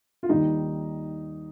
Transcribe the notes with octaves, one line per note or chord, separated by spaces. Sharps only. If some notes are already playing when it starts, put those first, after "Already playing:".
F4
D#2 D#3 G3 D#4